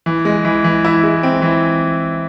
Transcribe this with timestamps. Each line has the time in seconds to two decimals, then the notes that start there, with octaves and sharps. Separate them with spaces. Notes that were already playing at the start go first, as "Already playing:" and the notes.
0.06 E3
0.25 G#3
0.45 E3
0.64 E3
0.84 E4
1.03 G#3
1.23 C4
1.42 E3